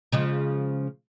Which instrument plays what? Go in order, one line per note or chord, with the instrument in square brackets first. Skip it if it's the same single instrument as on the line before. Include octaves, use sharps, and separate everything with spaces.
[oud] C#3 F3 G#3